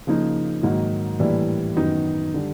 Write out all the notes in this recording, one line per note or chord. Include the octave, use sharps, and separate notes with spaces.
C#3 F3 A#3 D#4
G#2 D#3 F#3 A#3 D#4
A2 E3 G3 A#3 D4
F#2 D#3 F#3 B3 D#4
D3 G3